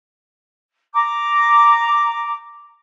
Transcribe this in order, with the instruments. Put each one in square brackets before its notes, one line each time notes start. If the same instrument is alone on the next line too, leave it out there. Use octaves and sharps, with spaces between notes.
[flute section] A#5 D6